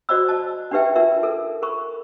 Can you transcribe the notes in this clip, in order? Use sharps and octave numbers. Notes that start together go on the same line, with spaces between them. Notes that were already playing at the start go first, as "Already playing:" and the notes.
F#4 C5 D5 D#5 B5 E6
D#5 A5
D4 D#4 G4 B4 E5 G5
D#4 F4 A#4 B4 E5
A4 A#4
A4 A#4 B5 C#6